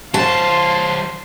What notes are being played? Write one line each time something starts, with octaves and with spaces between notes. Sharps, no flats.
F#3 C5 F5 A5 C6